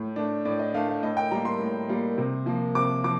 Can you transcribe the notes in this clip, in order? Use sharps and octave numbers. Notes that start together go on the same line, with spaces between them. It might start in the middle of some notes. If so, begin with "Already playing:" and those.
Already playing: A2
A3 D4
A2 D5
D#5
A3 D4 F5
F5
A2 D#5
G5
G3 A#3 A#5
C6
A2
G3 A#3
C3
F3 A#3
C3 D6
F3 D6